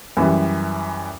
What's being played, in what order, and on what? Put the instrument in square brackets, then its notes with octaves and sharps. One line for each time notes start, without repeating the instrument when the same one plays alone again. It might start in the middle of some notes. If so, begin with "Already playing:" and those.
[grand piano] F#2 E3 G3